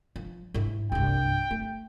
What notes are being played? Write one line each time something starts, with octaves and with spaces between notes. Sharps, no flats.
F3
G#2 E4
C2 G2 G5
A3